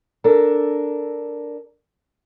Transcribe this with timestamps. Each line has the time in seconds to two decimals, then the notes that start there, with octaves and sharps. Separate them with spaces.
0.24 D4 A4 A#4